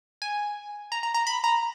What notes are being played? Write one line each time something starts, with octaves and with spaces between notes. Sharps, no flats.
G#5
A#5
A#5
A#5
B5
A#5